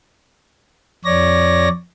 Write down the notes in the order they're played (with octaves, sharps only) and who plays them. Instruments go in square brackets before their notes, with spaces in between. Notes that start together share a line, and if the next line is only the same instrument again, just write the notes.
[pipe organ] F2 C#5 D5 A#6